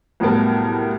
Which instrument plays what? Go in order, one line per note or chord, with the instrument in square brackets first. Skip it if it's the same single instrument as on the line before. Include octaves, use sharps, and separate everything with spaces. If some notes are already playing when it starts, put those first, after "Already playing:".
[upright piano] C2 A2 F#3 B3 A#4 A5